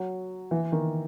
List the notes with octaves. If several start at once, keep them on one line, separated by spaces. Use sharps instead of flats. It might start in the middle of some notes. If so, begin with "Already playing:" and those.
Already playing: F#3
E3
D#3